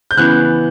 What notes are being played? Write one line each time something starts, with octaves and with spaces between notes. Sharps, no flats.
G6
C#3 E3 B3 F#6